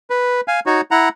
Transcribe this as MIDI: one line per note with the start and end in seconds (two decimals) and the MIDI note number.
0.10 0.41 71
0.48 0.60 77
0.48 0.60 80
0.66 0.81 63
0.66 0.81 66
0.66 0.81 73
0.91 1.09 64
0.91 1.09 78
0.91 1.09 82